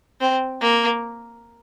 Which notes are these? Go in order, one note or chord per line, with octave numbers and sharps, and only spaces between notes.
C4
A#3